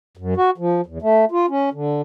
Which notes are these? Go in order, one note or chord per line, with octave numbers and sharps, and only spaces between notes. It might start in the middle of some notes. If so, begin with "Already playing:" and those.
F#2
F#4
F3
E2
A3
F4
C#4
D3